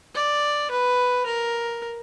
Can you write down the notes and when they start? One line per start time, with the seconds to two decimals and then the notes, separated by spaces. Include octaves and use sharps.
0.16 D5
0.71 B4
1.26 A#4